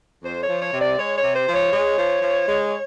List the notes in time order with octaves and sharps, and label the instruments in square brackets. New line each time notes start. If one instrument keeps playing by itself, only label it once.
[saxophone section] F2 C5
C#5
F3
C#5
C3
D5
G#3 C#5
C#5
C3
C5
F3
C#5
G#3
F3
F3
G#3